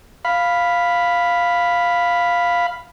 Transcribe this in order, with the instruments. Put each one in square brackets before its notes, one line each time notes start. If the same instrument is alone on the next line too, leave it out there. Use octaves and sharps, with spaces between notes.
[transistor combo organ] F5 B5